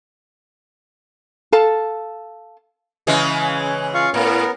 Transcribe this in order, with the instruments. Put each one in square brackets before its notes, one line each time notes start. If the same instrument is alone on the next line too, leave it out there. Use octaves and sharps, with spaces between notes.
[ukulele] A4 F5 A5
[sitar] C#3 E3 G#3
[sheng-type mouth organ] F4 F5 C#6
[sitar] A2 [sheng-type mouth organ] B3 A#4